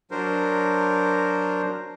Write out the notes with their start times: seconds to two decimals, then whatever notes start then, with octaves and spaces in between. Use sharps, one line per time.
0.11 F#3 D4 A#4 C5